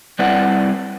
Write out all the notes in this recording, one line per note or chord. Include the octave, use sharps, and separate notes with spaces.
G3 C4 E4 B4 D5 F#5